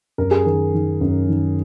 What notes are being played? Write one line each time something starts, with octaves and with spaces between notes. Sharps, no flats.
F#2 A#4
G#4
D#3 A#4
D#3
F#2
D#3